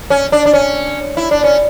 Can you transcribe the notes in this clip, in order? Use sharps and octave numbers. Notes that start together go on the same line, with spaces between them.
C#4
D4
D4
C#4
E4
D4
C#4